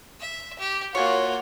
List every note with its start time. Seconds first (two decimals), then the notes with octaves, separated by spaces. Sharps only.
0.20 E5
0.59 G4
0.95 A#3 F4 F#4 C#5 G#5